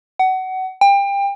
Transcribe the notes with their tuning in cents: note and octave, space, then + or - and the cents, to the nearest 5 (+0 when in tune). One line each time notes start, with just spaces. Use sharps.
F#5 +25
G5 +30